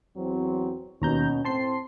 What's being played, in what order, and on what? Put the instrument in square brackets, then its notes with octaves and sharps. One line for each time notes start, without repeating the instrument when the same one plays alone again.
[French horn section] E2 F#3 C4
[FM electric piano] D#2 A#5 G6 [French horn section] B2 C#4
[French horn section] A2 C4 [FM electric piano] A5 C6 C7